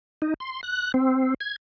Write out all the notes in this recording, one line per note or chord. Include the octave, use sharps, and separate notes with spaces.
D#4
C6
F#6
C4
G#6